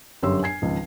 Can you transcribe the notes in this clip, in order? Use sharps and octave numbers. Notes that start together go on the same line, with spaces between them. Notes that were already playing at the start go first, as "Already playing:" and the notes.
G1 F#2 G4 C#5 C6 E6
G#5 G#6 C7
G#1 C#2 F3